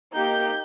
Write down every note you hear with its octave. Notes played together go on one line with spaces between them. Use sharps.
A#3 D#4 G4 G6